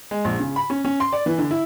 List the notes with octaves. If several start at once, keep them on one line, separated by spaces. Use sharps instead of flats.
G#3
A#1
C#3
B5
C#4
C#4
C6
D5
E3
D3
E4